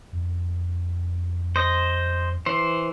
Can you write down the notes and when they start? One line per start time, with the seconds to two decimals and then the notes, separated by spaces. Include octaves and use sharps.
0.13 F2
1.56 C5 D#5
2.46 E3 C5